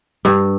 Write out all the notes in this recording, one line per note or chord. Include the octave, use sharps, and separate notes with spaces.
G2